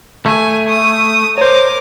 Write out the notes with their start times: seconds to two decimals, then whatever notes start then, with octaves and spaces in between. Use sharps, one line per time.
0.26 A3 G#5
0.68 D#6
1.38 A#4 C5 C#5 D6